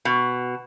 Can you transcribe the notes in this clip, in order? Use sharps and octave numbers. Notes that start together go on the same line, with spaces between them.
B2